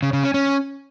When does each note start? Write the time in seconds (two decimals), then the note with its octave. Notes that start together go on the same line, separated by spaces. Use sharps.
0.03 C#3
0.13 C#3
0.24 C#4
0.34 C#4